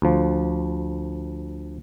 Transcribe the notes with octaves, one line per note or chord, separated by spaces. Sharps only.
D2 F3